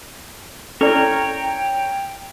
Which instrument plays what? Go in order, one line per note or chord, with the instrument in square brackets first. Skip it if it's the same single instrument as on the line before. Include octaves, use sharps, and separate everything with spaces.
[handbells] C#4 A4 [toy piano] E4 D5 [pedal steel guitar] A#4 C#5 [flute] G5